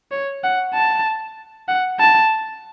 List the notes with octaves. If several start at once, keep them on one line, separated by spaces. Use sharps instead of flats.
C#5
F#5
A5
F#5
A5